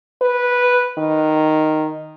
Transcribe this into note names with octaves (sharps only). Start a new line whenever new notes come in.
B4
D#3